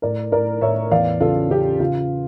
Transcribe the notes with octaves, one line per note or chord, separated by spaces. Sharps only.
A2 A#4 D5
A2 A#4 D5
A2 C#5 E5
E2 D5 F5
C#3 F4 A4
C#3 G4
C#3 F4